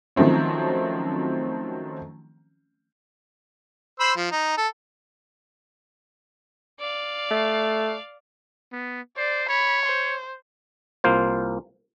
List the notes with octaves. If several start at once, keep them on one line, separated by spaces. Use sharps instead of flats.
D#3 F3 F#3 A3 C4 C#4
C5 B5 E6
F3
D#4
A4
D5 F5
A3
B3
C5 D5
C#5 B5
C5
C2 A#3 F4 C5